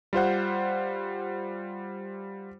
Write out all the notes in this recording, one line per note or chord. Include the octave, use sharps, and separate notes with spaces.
G3 F4 C5 F#5